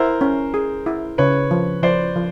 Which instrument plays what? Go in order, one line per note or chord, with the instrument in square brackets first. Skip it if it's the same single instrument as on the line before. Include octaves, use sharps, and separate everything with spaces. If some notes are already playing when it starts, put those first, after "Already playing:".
Already playing: [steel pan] E4 [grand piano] A#4 C5
[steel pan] C#4
G#4
E4
[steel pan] C#3 [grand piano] B4 C#5
[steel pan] F3
[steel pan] F3 [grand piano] C5 D5
[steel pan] F3